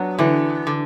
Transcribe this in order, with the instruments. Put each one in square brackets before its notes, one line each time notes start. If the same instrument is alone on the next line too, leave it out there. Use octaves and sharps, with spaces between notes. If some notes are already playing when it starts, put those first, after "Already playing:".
Already playing: [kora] F#3 D4 F#4 [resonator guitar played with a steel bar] B3
[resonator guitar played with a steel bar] D3 [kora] E3
[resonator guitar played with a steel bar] D3